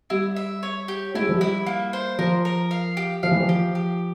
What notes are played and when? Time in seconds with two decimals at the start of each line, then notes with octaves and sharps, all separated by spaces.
0.10 G3 E4
0.36 E5
0.63 C#5
0.88 G4
1.14 G#3 E4
1.22 G3
1.29 F3
1.37 G3 E4
1.66 A#3
1.93 C5
2.19 F3 A#4
2.45 A#4
2.71 F5
2.97 G4
3.23 F3 F5
3.31 E3
3.41 F3
3.49 G4
3.75 G4